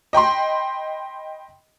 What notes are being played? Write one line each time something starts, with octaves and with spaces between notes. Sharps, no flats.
D#5 G5 B5 C6